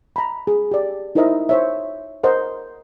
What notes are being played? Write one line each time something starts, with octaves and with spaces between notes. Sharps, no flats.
A#5 B5
G#4
G4 D5
D#4 E4 A#4 C5 D#5 E5
C5 C#5 E5
A#4 C5 D#5 F#5